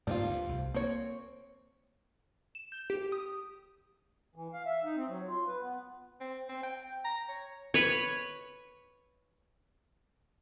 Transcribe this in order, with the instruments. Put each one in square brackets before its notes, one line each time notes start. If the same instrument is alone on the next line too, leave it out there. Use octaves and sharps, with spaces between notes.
[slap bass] G#2 D3 A#3 [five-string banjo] G3 C4 F4
[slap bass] D2 G2
C2
[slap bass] A#3 [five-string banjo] C4 C#5
[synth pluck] E7
G6
G4
D#6
[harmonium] E3
F5
E5
D#4
C4
F#3
F4
B4
B3
[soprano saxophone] C4
C4
G5
A#5
C#5
[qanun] B4 C#5